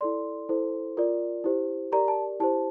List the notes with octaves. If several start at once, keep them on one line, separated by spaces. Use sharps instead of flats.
E4 A4 D5 C6
E4 A4 C5
F4 A#4 D5
E4 G4 C5
G4 A#4 D5 A#5
A5
E4 G4 C5 A5